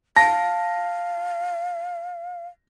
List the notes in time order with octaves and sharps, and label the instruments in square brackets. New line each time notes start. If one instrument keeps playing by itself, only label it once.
[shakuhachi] F5 [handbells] A5 [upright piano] A#6